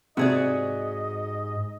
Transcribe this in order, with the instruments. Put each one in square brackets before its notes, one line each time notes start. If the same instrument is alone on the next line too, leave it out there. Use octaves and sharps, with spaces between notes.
[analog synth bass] G#2 [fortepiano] C3 [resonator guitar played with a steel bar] F#4 G#4 D5 [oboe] D#5